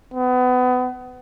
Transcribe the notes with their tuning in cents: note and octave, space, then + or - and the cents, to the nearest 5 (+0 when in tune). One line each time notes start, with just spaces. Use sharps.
B3 +30